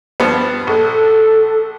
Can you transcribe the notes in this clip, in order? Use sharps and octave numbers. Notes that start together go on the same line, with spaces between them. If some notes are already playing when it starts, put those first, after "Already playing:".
G2 F3 B3
A#1 A4